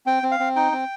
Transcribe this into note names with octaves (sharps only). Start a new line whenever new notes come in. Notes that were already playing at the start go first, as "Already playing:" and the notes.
C4 G5
C4
F5
C4
D#4 G5
C4